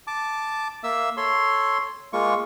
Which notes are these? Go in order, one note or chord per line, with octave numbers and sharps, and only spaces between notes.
A5 D6
A#3 E5 E6
A4 C#5 C6
G#3 A#3 F4 C#6